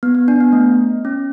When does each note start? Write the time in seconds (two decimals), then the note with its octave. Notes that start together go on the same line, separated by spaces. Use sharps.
0.03 B3
0.15 B3
0.28 D4
0.41 B3
0.53 A3
1.05 C#4